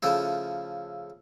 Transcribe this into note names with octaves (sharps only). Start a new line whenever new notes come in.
C#3 F3 A3 E4